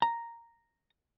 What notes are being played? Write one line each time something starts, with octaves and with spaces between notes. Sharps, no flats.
A#5